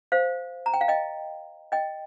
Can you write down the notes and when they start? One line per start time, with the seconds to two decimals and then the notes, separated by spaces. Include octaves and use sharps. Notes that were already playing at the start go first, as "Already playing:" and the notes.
0.12 C5 F5
0.66 A#5
0.74 G5
0.81 F5
0.88 D#5 G5
1.72 D#5 G5